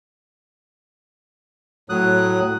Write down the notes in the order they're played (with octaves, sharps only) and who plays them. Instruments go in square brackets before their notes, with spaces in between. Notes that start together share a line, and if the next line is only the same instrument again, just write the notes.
[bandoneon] A2 F#3 D#6 F#6